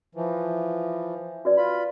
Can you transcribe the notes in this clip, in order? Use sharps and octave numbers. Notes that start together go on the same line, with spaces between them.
E3 F3
F#4 B4 D5
F4 B5